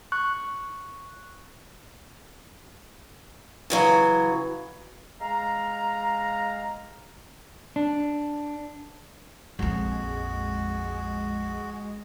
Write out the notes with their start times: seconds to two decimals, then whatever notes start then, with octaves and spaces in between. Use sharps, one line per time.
0.12 C#6 F#6
3.70 C#3 E3 F#3
5.20 G#3 F5 A#5
7.76 D4
9.59 A#1 F2 G#3 F#4